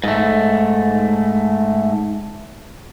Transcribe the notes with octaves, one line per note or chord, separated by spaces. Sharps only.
G#2 A3